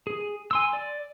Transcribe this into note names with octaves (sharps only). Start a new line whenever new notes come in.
G#4
G#5 C6 E6
D5